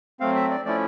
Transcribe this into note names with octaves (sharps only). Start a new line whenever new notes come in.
F#3 A3 C4 F5
E5
D5
F3 A3 C#4 E4 D5